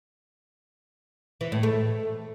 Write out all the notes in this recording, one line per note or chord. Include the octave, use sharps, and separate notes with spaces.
E3
A2
A3